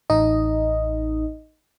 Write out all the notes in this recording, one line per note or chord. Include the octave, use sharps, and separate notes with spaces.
A1 D#4 D#5